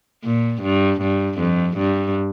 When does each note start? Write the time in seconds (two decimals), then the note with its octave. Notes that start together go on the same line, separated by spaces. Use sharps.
0.24 A#2
0.62 G2
1.01 G2
1.39 F2
1.77 G2